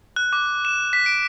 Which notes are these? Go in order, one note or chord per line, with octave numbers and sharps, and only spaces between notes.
F#6
D6
E7
B6
D7